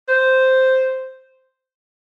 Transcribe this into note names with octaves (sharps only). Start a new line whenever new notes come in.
C5